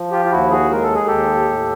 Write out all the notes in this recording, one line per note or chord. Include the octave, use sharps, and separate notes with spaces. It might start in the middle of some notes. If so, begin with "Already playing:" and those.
Already playing: F3
F4 G4
F4
D#2 E4 F#4
F#4 G#4
G#3 A#4
A4
G#4
D#2 G4 A4
A2